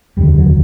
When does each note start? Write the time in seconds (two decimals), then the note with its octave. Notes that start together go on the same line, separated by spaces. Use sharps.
0.17 F1 D#2 D3 G3
0.38 F#3